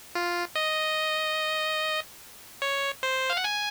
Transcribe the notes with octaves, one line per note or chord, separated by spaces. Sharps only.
F4
D#5
C#5
C5
F5
F#5
G#5